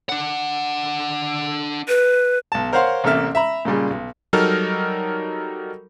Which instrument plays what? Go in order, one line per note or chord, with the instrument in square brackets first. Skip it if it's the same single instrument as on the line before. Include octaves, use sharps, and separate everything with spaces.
[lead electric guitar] D4 F#5
[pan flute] B4
[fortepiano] B1 A5
A#4 C5 C#5 F5 F#5 C6
A1 C3 A#3 A4 E5 F6
E5 A#5 B5
A#2 C#3 G3 G#3
B1
[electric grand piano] F#3 G3 D#4 A4 A#4 F6